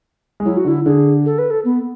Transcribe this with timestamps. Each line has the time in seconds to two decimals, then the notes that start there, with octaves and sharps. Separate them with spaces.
0.40 G#3
0.45 F#3 E4
0.57 F#4
0.65 D3
0.68 E4
0.86 D3 G#4
1.26 A4
1.38 B4
1.50 A4
1.65 B3